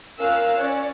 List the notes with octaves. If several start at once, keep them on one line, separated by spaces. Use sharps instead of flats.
C#4 F4 A#4 F5 E6 F#6
C#4 C#5 D5